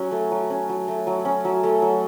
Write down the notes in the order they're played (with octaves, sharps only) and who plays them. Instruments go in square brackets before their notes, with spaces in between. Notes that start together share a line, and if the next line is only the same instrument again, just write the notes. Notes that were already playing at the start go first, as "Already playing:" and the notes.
Already playing: [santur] F#3 C#4
A3
F#3
C#4
F#3
A3
F#3
C#4
F#3
A3
F#3